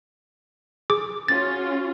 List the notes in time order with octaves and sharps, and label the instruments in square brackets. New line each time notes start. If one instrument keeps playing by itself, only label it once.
[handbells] G#4 D6
[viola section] C#4 F4 F#4 [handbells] A6